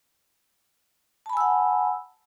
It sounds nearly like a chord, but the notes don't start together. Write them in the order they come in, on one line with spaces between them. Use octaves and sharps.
A5 B5 G#5 E6 F#5